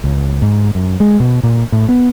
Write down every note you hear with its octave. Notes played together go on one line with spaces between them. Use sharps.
C#2
G#2
F#2
G#3
B2
A#2
A2
B3